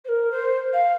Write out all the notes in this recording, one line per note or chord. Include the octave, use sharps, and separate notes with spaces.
C5
A#4
C5
F5